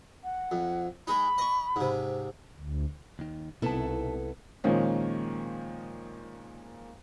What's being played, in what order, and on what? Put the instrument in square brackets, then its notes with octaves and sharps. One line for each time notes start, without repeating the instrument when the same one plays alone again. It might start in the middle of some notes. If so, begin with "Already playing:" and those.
[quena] F#5
[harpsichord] F2
[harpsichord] G#3 D#4 [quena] B5
[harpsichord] D#5 C#6
G#2 C3
[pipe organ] D2
[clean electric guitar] D#2 D#3
[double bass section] C2 [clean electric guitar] B2 D#4 A5 [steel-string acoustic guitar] B3 E4 A4
[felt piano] A#2 D#3 F3 G#3 C#4